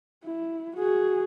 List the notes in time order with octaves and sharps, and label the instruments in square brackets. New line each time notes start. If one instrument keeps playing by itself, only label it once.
[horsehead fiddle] E4
F#4 G#4